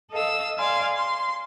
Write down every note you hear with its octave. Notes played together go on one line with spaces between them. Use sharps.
A4 D#5 F5 E6
D5 F5 G#5 C6
C6